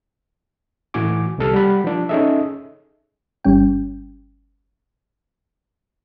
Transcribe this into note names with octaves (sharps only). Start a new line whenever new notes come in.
A2 E3 F#4 G#5 D6
C2 C3 G3 A4 F6
G3 F#5 B5
F3 D4
C#4 D#4 G#4 A4 D#5 E5
G1 G3 C#4 G5